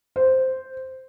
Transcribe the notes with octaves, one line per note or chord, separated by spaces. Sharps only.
C5